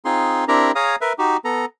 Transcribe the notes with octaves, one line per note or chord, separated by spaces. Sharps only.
C4 D#4 F4 G#4 C6
C4 D4 E4 G4 A#4 A#5
G#4 C#5 F5 A#5 D#6
A#4 B4 E5
D#4 F#4 G4
B3 A4 A#5